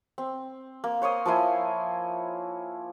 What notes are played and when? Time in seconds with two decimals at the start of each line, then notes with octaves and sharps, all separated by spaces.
0.18 C4
0.84 A#3
1.02 C5 C#5 C6 D#6
1.26 F3 A#3 E4 G#5